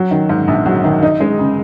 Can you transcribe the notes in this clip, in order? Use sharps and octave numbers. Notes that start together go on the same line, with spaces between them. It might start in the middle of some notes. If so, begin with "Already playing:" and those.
Already playing: F#3
D#3
G#2
A#1
F#3
D#3
D#4
G#3
C#3